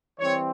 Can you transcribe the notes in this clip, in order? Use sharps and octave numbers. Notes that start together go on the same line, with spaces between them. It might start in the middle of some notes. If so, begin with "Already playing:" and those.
E3 G3 C4 C#5